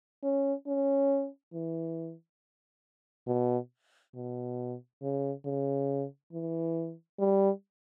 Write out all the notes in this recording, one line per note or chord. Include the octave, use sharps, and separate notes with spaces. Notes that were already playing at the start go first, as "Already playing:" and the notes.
C#4
C#4
E3
B2
B2
C#3
C#3
E3
G3